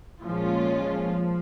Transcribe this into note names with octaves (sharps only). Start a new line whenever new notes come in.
A#2 F3 G#3 C#4 F4
F3